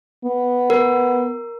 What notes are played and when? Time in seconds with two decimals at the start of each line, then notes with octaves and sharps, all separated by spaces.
0.25 B3
0.70 A#4